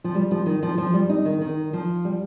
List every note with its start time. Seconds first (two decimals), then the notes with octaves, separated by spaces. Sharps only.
0.04 F3
0.15 G3
0.31 F3
0.46 D#3
0.63 F3
0.78 F3
0.94 G3
1.09 D#4
1.25 D#3
1.41 D#3
1.73 F3
2.05 G3